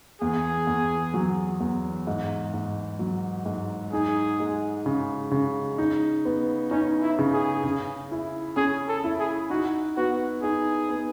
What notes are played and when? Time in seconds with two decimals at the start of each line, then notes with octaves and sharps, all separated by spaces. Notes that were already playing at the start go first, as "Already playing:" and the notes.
0.21 E2 G#4
0.67 E2
1.14 F#3
1.60 E2
2.07 G#2
2.54 G#2
2.99 F#3
3.46 G#2
3.93 D#4 G#4
4.40 G#3
4.86 C#3
5.31 C#3
5.78 D#4
6.25 B3
6.71 C#4 D#4
7.02 E4
7.18 C#3
7.34 G#4
7.64 C#3
8.11 E4
8.57 C#4 G#4
8.88 A4
9.04 E4
9.19 G#4
9.50 D#4 F#4
9.97 B3 F#4
10.43 D#4 G#4
10.89 B3